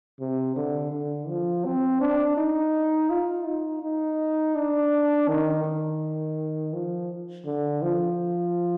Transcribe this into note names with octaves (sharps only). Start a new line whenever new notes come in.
C3
D3
D3
F3
C4
D4
D#4
F4
D#4
D#4
D4
D#3
D#3
F3
D3
F3